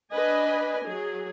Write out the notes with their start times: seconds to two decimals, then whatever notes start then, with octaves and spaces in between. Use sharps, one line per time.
0.12 D4 B4 D#5 G#5
0.85 F#3 G#4